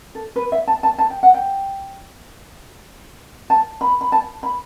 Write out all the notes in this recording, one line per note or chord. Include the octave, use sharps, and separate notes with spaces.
A4
B4
E5
A5
A5
A5
G5
F#5
G5
A5
B5
B5
A5
B5